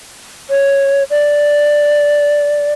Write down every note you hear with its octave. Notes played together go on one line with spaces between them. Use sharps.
C#5
D5